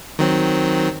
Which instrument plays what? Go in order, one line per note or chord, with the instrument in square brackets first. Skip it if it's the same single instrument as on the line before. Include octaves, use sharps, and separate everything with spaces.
[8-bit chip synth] D#3 F#3 C4